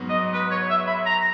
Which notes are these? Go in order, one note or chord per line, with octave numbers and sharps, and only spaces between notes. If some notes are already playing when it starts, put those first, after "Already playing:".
Already playing: G#2 F#3 B3 F#4
D#5
B4
C#5
E5
B5
A#5